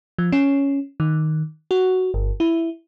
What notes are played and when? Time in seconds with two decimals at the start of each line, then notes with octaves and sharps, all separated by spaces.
0.18 F3
0.32 C#4
1.00 D#3
1.71 F#4
2.14 G1
2.40 E4